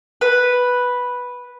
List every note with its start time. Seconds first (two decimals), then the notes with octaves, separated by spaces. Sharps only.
0.21 B4